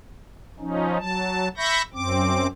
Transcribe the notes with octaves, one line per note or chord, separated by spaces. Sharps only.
F3 C#4 D#4
F#3 A5
E5 B5 C#6 G6 A#6
F#2 C4 D6